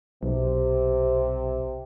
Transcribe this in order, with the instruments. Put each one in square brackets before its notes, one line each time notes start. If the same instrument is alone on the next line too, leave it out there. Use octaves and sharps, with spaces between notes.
[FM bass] B1 [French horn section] C3